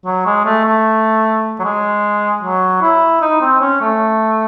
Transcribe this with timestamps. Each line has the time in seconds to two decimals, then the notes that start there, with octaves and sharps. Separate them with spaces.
0.05 F#3
0.26 G#3
0.45 A3
0.64 A3
1.60 F#3
1.64 G#3
2.43 F#3
2.81 E4
3.22 D#4
3.41 C4
3.60 C#4
3.81 A3